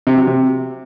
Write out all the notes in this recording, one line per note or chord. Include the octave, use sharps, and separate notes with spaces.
C3
F#3
C3